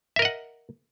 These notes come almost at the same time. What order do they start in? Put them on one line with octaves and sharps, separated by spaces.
E5 A#4 D#5 F#5